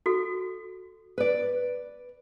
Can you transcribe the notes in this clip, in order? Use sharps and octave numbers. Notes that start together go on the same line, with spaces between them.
F#4 A4
B4 D5